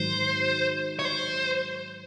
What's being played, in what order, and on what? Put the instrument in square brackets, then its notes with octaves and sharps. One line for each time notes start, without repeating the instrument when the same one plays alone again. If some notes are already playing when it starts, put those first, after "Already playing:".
Already playing: [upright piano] G#2 D#3 F#3 [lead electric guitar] C5
[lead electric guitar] C#5
C5